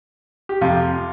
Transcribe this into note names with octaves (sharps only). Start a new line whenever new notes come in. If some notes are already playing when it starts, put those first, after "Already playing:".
G4
F2 C3 F3 F4